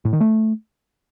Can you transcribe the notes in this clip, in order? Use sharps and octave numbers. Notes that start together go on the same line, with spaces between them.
A2
D#3
A3